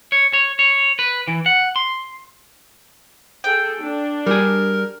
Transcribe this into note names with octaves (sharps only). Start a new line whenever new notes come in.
C#5
C#5
C#5
B4
E3
F#5
C6
G#4 A4 G5
D4
G3 G#4 A#4